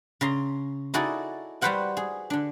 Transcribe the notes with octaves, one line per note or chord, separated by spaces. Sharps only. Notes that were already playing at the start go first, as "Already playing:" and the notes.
C#3 A#5 C6
D#4 E4 F#4 G#4 A4 D5
G3 F#4 B4 C5 F#5 G5
G#4
D3 D4